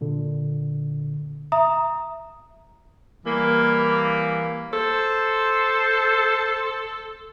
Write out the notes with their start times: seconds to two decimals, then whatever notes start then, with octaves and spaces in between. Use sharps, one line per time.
0.01 A#2 D3
1.52 E5 A#5 D#6
3.26 E3 G3 A#3
4.73 A4 C5